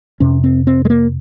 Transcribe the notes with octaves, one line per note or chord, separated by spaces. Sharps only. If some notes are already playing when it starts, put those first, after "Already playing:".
F2 C3 C#4
C4
C4
G#3
A#3